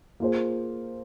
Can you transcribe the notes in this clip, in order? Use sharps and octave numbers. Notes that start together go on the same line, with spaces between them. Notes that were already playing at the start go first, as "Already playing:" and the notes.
A#3 F4 G#4 C5